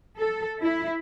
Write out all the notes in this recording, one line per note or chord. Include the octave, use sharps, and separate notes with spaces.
A4
E4